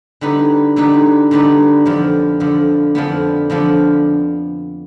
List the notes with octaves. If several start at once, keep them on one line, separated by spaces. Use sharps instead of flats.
D3 G3 B3 D#4 B4
D3 G3 B3 D#4 B4
D3 G3 B3 D#4 B4
F2 D3 F3 B3
F2 D3 F3 B3
F2 D3 F3 B3
F2 D3 F3 B3